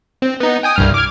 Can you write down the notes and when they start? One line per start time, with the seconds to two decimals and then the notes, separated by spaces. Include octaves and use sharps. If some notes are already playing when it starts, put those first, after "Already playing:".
0.22 C4
0.40 B3 D#4
0.63 G5 G#5 D#6
0.76 C2 G2 F6
0.94 D6 F6 G#6